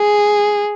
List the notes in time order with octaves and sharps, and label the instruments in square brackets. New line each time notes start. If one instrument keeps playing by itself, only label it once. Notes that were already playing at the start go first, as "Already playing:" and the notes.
Already playing: [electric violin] G#4